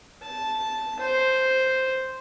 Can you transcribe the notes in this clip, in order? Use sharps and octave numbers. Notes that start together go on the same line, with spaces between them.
A5
C5